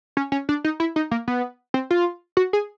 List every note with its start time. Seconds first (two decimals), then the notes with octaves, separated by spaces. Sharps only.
0.17 C#4
0.32 C#4
0.49 D4
0.64 D#4
0.80 E4
0.96 D#4
1.11 A#3
1.28 B3
1.74 C4
1.90 F4
2.37 F#4
2.53 G#4